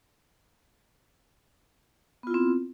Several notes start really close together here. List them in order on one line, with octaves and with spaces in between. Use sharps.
B3 F4 E4 C4